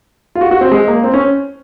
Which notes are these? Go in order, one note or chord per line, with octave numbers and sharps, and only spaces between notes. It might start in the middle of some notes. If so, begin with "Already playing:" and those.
F4
F#4
F#4
C4
G#3
A#3
C4
C#4